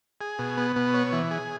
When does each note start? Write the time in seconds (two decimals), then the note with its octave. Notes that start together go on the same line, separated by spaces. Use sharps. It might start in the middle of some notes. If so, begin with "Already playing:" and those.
0.21 G#4
0.39 B2
0.57 B3
0.76 B2
0.94 C#5
1.13 E3
1.31 G#4